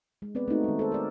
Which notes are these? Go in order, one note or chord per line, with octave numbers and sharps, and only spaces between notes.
G#3
B3 C4 B4 D5
A3 C4 D#4 F#4
D#3 G#3
A4 C5
A#4 D5